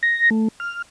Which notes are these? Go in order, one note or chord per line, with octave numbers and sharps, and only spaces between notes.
A#6
A3
F6